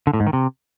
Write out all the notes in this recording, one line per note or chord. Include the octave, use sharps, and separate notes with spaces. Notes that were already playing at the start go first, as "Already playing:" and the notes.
D3
A2
G#2
D#3
C3